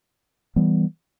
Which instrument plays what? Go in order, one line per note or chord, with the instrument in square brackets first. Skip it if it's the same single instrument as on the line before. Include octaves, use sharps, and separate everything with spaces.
[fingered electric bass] E3 G3 B3